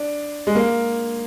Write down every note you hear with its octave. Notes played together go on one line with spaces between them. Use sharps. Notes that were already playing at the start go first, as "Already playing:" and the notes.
Already playing: D4
G#3
A#3